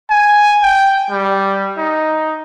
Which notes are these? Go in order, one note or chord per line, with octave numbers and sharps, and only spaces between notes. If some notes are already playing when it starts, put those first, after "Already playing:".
G#5
G5
G3
D#4